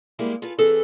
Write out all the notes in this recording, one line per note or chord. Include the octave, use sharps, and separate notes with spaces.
G3 G#3 A#3 E4 G4 G#4
F4 G#4 A4 B4
E3 C4 G#4 A4 B4